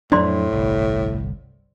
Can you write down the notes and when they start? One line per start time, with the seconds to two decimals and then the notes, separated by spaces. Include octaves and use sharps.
0.12 F2 A2 F#3 D4 C5 D5 C6
0.53 G1 C2